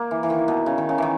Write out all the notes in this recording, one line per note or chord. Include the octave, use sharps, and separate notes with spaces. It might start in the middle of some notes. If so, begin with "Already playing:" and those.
Already playing: A#3
E3
E3
D#3
B2
C#3
D#3
C#3
D#3 E3